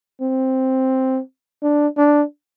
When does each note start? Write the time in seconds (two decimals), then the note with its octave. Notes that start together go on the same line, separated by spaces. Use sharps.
0.21 C4
1.63 D4
1.97 D4